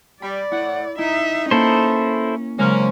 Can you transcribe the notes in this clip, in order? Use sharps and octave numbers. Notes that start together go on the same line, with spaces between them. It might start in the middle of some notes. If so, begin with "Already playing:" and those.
G3 D5 B5
A2 E4 F#5
D#4 E4 E5
A#3 C#4 E4 A4 C5
C#3 F#3 G#3 A#3 C#4 C5